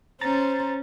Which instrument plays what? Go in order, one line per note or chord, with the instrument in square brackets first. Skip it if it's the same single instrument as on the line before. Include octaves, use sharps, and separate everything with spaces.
[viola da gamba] C#4 [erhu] C5 [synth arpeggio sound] A#5 A6